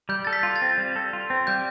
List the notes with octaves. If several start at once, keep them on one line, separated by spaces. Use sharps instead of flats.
G3 G6
A4 A6
B6
F4
A6
C4
G3
A4
F4
C4
G3 G6